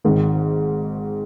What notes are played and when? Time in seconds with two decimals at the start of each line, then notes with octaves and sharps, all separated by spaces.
0.04 G#1 G#2 D#3